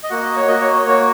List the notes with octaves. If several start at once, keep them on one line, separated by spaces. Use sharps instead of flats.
D#5
A#3 F#4 F#5
D#5
C#5
A#3 F#4 D#5
C#5
C#5
A#3 F#4 C#5